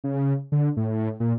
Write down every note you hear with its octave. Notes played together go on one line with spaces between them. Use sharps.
C#3
D3
A2
A#2